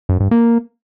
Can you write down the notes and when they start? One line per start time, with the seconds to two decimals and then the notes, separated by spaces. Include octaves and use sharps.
0.09 F#2
0.20 G2
0.31 A#3